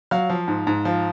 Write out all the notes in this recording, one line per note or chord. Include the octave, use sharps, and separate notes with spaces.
F#3 F5
F3
G#2
G#2
F3